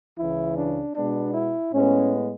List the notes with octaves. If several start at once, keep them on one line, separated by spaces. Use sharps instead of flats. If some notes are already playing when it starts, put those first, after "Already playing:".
C#2 C#3 E3 E4
D4
B2 G#3 B3 D4
E4
A2 G#3 B3 C#4